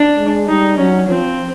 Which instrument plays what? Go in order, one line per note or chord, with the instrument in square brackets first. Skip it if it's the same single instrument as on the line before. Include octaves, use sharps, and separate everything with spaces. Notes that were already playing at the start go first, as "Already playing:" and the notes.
Already playing: [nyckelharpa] D4
[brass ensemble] G#3
[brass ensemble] G3 [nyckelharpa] D#4
[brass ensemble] F#3 [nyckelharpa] C#4
[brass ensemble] F3 [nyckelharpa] C4